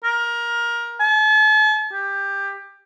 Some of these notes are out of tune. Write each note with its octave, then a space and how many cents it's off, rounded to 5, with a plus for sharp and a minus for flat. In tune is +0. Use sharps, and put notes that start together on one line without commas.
A#4 +20
A5 -45
G4 +15